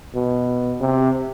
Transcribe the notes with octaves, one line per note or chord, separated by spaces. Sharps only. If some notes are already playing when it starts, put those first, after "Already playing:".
B2
C3